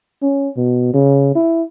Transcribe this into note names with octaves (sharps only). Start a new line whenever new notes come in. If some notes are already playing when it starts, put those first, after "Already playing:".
C#4
B2
C#3
E4